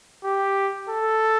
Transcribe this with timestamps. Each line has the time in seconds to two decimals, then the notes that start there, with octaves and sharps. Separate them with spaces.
0.24 G4
0.89 A4